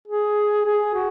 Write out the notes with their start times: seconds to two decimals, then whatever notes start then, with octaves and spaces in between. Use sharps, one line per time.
0.08 G#4
0.66 G#4
0.94 F#4